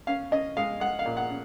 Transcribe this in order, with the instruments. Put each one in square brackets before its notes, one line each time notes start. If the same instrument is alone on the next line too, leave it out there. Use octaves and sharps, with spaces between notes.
[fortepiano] C#4 F5
C#4 D#5
G#3 F5
G#3 F#5
F5
A#2
F#5
C#4